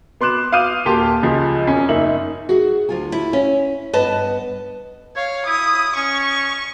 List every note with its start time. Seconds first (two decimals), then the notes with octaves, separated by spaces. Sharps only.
0.21 B3 C6 D6 F#6 E7
0.52 F5 D6 D#6 F6 G6 D#7
0.85 D#1 A#3 G4 G5 A5 C6
1.23 C#2 F3 G#4
1.67 E1 C#4 G#5
1.89 F#1 A#3 D#4 E5 F#7
2.49 F#4 G#4
2.89 D2 F4 G#5
3.12 E4
3.33 C#4 E5
3.93 G2 B3 B4 D#5 A5
5.16 C#5 F5
5.46 E4 D#6
5.96 C#4 C#6